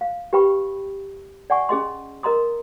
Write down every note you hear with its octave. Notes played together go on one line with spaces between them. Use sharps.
F5
G4 B4 G5 B5 C#6
D5 F#5 G#5 C#6
C#4 G#4 D#5 C6
A#4 D#5 A#5 C6 D#6